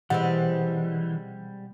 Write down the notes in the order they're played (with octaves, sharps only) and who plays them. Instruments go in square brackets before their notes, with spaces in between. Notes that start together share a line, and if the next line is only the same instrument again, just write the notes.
[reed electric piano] B2 F#5 [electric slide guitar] E3 [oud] G3 G#3 C4